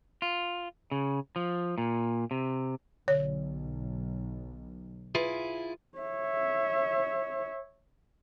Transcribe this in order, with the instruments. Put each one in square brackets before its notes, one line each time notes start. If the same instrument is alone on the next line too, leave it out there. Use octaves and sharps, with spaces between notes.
[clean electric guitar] F4
C#3
F3
A#2
C3
[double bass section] B1 [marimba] D3 [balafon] C#5
[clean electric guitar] E4 F4 G#4 [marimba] B4
[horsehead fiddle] C#5 E5